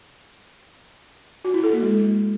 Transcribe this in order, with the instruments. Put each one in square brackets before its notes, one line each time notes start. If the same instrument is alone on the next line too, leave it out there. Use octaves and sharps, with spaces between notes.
[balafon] F#4
E4
A4
A#3
G#3